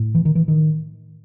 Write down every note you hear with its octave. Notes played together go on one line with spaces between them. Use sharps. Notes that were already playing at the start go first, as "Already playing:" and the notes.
Already playing: A2
E3
D#3
E3
D#3